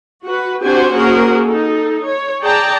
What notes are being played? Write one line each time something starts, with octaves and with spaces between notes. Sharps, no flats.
F#4 B4
C4 D4 F#4 G4 C5 G#5
A#3 C#4 F#4 G#4 A#4 C5
D#4 A4
C#5
G#4 D5 G5 A5 A#5